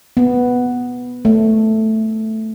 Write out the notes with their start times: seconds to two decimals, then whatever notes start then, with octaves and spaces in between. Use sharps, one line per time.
0.17 B3
1.25 A3